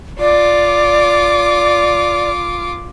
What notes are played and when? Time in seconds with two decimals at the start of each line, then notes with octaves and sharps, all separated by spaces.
0.20 F4 D5 D6